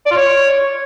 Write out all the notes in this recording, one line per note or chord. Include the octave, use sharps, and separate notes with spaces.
D5
F4
C#5